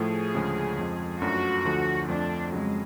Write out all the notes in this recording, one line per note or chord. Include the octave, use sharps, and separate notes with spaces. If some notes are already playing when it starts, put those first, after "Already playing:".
Already playing: A2 F3 A3 G#4
D2 C#3 F3 G#3 C#4
F2 F3 G#3
F#2 F3 A3 D4 F#4
D2 D3 F3 A3
F2 F3 A3 D4
F2 C#3 F#3 G#3